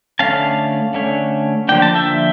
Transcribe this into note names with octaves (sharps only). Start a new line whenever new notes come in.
D3 A3 C#4 F5 A5
D3 A3 C#4
D3 F3 A#3 D4 G5
A5
E5 G5